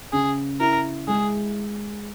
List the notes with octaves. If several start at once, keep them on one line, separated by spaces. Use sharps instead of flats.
C#3 G#4
E4 A#4
G#3 G#4